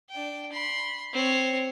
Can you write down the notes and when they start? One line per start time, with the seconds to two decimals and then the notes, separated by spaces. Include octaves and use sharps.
0.11 D4 G5
0.52 B5 C6
1.13 C4 C#5